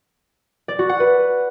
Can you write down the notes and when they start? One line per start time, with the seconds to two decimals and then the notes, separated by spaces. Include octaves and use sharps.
0.68 D5
0.79 F#4
0.89 F#5
1.00 B4